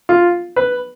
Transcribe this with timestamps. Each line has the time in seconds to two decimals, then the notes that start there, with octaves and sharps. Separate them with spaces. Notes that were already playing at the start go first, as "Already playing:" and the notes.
0.09 F4
0.56 B4